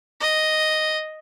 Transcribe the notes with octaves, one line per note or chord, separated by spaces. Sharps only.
D#5